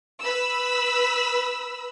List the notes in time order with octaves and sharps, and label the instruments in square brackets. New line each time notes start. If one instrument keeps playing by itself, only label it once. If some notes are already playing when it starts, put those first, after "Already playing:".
[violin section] B4 B5 E6